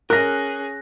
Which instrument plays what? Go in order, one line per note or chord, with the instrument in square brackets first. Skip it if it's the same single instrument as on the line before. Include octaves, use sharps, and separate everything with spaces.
[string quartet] C#4 G#4 [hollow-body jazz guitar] A#4 [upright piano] F#6 A#6